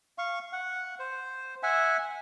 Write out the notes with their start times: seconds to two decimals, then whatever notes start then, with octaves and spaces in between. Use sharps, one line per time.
0.18 F5 C#6
0.53 F#5
0.99 C5
1.63 E5 F#5 G#5